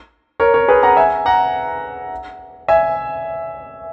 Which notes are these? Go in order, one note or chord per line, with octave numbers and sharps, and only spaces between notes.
A#4 C#5
A#4 C#5
G#4 B4
F#5 A#5
E5 G#5
F#5 A#5
E5 G#5